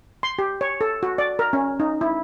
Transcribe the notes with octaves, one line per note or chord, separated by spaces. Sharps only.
C6
G4
C#5
A4
F#4
D5
A#4
C#4
D#4
E4